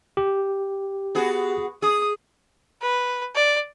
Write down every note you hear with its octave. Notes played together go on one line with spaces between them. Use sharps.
G4
B3 F#4 G#4
G#4 D#6
B4
D5